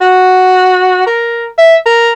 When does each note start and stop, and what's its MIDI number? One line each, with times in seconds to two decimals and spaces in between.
0.01 1.02 66
1.07 1.46 70
1.59 1.76 76
1.86 2.12 70